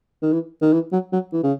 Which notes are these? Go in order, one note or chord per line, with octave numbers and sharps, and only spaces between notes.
D#3
E3
D#3
E3
F#3
F#3
E3
C#3